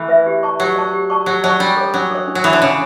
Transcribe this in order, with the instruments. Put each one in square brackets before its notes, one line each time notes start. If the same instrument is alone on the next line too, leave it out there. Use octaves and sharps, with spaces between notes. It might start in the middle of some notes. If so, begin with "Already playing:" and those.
Already playing: [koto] E3 A3
[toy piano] B4 E5
G4
D5 A5 C#6
[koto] F#3 [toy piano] G4
[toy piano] D5 A5 C#6
G4
D5 A5 C#6
[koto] F#3 [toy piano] G4
[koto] F#3 [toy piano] D5 A5 C#6
[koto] G3 [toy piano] D4
[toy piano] A4 C#5
[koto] F#3 [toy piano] D4
[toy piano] A4 C#5
D4
[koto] F#3
[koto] E3 [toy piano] A4 C#5
[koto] D3
[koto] C#3 [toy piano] D4